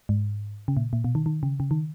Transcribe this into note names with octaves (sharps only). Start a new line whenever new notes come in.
G#2
C#3
A#2
A#2
B2
D#3
D#3
C#3
C#3
D#3